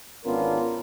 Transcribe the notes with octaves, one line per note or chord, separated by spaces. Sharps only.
G#1 B3 C#4 D4 F4 A#4